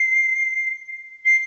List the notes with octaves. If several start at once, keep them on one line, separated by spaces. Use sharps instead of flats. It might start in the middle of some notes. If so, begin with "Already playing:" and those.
Already playing: C7
C7